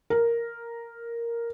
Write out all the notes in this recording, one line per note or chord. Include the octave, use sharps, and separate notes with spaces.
A#4